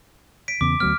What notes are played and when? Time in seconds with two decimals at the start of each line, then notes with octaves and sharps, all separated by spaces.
0.48 B6 D7
0.61 E2 C#3 B3 D6
0.80 D2 F#3 B3 F6